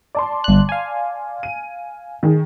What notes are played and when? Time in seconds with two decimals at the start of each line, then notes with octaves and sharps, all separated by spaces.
0.15 D5 A5 C6
0.44 G1 F#6
0.69 F5 G#5
1.43 D#7
2.23 D#3 G#4